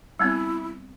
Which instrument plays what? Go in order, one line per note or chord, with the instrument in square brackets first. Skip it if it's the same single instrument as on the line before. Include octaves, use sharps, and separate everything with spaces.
[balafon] G3 B3 C4 [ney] E4